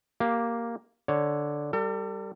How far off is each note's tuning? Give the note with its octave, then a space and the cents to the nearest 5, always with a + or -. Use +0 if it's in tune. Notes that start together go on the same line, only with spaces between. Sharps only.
A#3 +0 G4 +0
D3 +0 C#5 +0
G3 +0 A4 +40